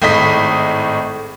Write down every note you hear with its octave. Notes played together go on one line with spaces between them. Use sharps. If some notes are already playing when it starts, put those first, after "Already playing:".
G#1 A2 D#5 B6